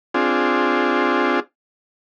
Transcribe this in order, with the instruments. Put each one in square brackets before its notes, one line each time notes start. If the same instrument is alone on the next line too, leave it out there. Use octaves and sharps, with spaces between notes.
[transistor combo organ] C4 D4 F4 G#4